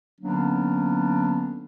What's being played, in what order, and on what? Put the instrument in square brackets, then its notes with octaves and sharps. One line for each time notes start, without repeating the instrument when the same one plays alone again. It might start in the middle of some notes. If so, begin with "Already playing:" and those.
[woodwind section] D3 F#3 A#3 B3 C#4 D4